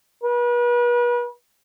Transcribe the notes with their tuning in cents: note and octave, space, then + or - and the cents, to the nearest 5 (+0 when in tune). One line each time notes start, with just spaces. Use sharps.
B4 -40